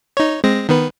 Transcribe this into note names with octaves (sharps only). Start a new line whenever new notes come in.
D#4 C#5
G#3 C4 A#6
D#3 B3 B4